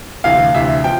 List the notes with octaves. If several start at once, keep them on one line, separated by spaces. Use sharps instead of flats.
D2 C3 E3 F5
D2 C3 E3 E5
F3 G5